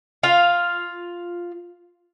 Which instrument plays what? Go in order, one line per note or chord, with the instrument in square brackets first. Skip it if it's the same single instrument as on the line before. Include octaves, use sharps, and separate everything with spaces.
[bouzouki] F4 F5